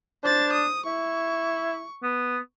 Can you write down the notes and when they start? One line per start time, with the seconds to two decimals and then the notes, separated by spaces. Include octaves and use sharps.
0.24 D4 C5 A6
0.53 D#6
0.86 E4 C#6
2.03 B3